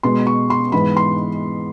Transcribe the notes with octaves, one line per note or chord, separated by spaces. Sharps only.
B2 G#3 B3 C6
C#6
C6
G#2 E3 G#3 B3 B5
C6